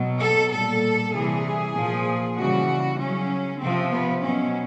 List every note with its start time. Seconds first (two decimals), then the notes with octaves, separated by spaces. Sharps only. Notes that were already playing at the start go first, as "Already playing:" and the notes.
Already playing: B2 F#3
0.19 A4
0.50 A#2 G3 A4
1.13 C3 E3 G3 G#4
1.74 A#2 F3
2.36 C#3 E3 G3 F#4
2.98 C#3 F#3 C#4
3.59 C3 F3 C4
3.91 B3
4.22 B2 F#3 C#4